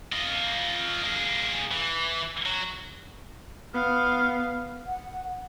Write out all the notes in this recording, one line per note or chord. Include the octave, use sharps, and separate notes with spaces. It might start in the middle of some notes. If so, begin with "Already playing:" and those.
F4 D#5
A#3 G#4
E3
F#3
B3 F5
F#5